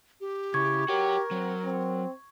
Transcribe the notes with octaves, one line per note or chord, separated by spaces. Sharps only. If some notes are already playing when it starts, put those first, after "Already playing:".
G4
C#3 E4 C#6 G#6
F#4 G4 A#4 C#5
F#3 C4
C4